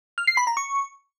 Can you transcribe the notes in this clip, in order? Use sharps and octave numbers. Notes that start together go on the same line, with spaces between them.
F6
C7
B5
A#5
C#6